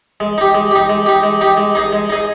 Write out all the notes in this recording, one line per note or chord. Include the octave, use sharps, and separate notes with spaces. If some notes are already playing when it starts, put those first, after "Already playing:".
G#3
D#4 G4
G#3
D#4 G4
G#3
D#4 G4
G#3
D#4 G4
G#3
D#4 G#4 D#5
G#3
D#4 G#4 D#5